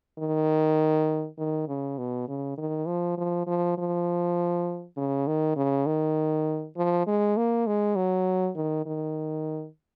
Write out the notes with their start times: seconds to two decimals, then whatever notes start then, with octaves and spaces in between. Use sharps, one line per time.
0.19 D#3
1.38 D#3
1.68 C#3
1.98 B2
2.28 C#3
2.58 D#3
2.87 F3
3.18 F3
3.47 F3
3.78 F3
4.97 C#3
5.27 D#3
5.56 C#3
5.86 D#3
6.77 F3
7.07 G#3
7.37 A#3
7.67 G#3
7.96 F#3
8.56 D#3
8.86 D#3